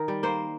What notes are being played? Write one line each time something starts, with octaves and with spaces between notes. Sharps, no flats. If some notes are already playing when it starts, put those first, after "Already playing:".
Already playing: D#3 A#4
G3
A#3 C5